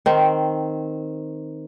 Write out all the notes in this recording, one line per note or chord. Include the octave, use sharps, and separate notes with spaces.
D#3 C4